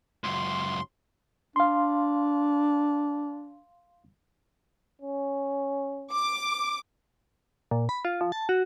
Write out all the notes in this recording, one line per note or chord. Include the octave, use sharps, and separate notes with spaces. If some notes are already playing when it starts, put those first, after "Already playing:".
C#2 F#2 C6
D4 F5 C6
C#4
D6
A#2
B5
F4
F3
A5
F#4